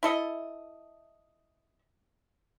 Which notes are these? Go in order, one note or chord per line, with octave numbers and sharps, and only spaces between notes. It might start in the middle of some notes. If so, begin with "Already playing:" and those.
E4 A4 D#5